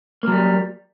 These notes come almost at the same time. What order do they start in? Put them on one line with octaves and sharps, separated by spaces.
A#3 F#3 G3